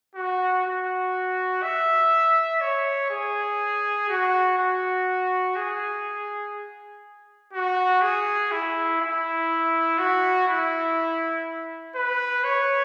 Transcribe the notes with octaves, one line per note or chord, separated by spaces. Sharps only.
F#4
F#4
E5
C#5
G#4
F#4
F#4
G#4
F#4
G#4
E4
E4
F#4
E4
B4
C#5